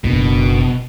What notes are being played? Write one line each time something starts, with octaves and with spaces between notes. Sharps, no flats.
F#1 B2 D4